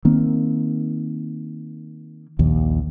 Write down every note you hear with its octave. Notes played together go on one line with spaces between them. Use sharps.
D#3 A#3 C4
A#1 D#2